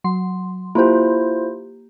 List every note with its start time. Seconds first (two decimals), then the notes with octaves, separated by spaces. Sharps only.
0.04 F#3 C6
0.75 A#3 E4 F4 G4 C5